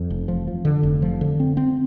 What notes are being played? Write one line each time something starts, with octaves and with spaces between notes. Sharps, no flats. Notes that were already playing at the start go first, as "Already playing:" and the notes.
Already playing: F2
F1
F3
F3
D3
F1
F3
D3
C4
C4